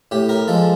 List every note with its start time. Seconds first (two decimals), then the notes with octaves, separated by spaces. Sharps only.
0.11 A2 G4
0.29 A#4
0.48 F3 G#3 A4